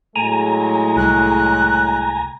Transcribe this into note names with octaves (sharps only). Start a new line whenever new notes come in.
A2 F#3 G#3 G#5 A#5
C2 F#6